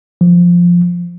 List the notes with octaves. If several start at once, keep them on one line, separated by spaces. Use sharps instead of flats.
F3